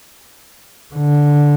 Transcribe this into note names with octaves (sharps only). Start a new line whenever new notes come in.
D3